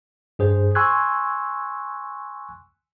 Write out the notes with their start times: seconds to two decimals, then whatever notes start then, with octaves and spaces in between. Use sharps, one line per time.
0.39 G2 G#4 C5
0.75 G#5 C6 C#6 E6 F#6 G#6